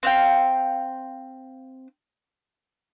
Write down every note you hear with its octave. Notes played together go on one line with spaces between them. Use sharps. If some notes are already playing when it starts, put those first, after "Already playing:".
C4 F5 G5